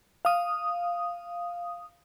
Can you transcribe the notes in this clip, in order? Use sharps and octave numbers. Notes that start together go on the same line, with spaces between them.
F5 D#6